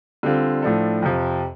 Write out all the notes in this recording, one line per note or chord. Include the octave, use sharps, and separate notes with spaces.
D3 G3 C4 F4
A2 F3 D4 A4
F2 C3 F3